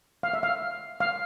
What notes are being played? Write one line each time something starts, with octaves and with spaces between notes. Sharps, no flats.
F5
E5
F5
F5